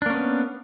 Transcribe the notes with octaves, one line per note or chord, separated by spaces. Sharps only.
A#3 B3 C#4 D4